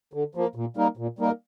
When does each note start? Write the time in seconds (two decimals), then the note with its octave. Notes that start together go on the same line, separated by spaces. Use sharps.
0.13 D3
0.35 F3 A#3
0.55 A#2
0.77 G3 A#3 D#4 A#4
0.97 A#2
1.19 G3 A#3 D#4 A#4